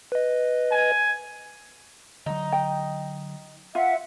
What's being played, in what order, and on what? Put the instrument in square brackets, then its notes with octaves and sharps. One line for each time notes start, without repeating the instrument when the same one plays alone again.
[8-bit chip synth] B4 D#5
[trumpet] G#5
[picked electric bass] D3 F#3 [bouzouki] D#4
[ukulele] G5
[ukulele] F4 [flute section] E5 F#5